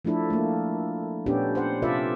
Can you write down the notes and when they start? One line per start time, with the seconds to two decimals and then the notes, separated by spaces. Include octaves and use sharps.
0.05 F3 A3 D4 E4 A4
0.30 A3 A#3
1.26 A#2 B3 C#4 D4 G4 A4
1.55 C5 F#5
1.82 C3 F4 A4 B4 D5 E5